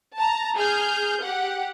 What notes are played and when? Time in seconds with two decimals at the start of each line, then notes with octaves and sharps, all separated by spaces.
0.17 A5 A#5
0.56 G#4 F6 G6
1.21 G4 F#5